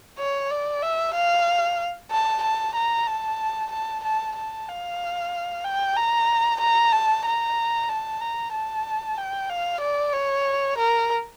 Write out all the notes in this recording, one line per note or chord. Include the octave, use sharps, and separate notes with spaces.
C#5
D5
E5
F5
A5
A5
A#5
A5
A5
A5
A5
F5
G5
A#5
A#5
A5
A#5
A5
A#5
A5
G5
F5
D5
C#5
A#4